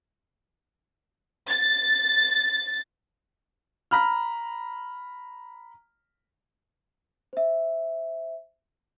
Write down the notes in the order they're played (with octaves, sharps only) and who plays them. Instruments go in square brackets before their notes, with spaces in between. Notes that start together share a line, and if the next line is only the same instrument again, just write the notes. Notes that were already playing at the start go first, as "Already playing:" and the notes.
[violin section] A6
[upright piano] A#5 B5 F6
[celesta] C5 E5